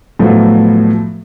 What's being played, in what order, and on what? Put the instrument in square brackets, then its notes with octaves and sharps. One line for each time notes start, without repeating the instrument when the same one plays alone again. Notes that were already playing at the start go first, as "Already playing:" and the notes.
[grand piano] A2 F3 F#3 A3 B3